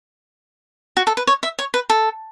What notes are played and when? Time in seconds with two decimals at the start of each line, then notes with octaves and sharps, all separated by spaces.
0.97 F#4
1.07 A4
1.17 B4
1.27 C#5
1.43 E5
1.59 C#5
1.74 B4
1.90 A4